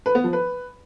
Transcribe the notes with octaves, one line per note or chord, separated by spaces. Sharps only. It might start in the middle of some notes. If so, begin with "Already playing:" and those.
B4
B3
F3
B4